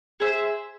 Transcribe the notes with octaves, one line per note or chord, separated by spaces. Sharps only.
G#4 C5 E5